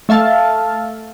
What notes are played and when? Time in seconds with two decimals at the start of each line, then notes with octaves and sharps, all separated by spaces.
0.09 A3 E5 F5 A5